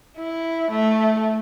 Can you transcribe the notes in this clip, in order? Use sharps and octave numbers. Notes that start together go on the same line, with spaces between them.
E4
A3